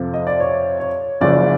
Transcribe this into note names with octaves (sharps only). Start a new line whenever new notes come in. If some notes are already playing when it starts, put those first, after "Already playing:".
Already playing: F2 C3 F3
D#5
D5
C#5
C#5
F#1 F#2 C#3 F3 D5